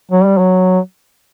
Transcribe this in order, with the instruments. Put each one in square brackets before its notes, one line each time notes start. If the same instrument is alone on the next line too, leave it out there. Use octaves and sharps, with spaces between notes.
[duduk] F#3
G3
F#3